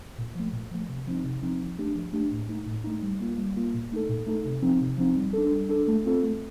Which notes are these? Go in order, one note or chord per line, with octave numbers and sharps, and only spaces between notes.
A#2
F3 A3
A#2
F3 A3
C3
F3 C4 D#4
C3
F3 C4 D#4
F3
A3 D4 G4
F3
A3 D4 G4
A2
A3 D#4
A2
A3 D#4
G3
A#3 F4
G3
A#3 F4
A#2
A3 D#4 A4
A#2
A3 D#4 A4
C3
F3 C4 D#4
C3
F3 C4 D#4
G3
D4 A4
G3
D4 A4
A3
C4 F4 A4
A3